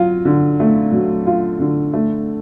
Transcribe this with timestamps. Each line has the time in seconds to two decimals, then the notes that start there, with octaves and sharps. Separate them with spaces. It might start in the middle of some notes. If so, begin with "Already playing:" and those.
Already playing: F#3 F4
0.25 D3
0.60 A3
0.92 F#3
1.27 F4
1.60 D3
1.93 A3